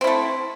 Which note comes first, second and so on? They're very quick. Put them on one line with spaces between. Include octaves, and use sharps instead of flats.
C4 E4 A3